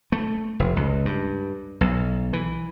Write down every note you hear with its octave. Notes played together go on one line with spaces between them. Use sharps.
A3
F1
C#2
G2
B1
E3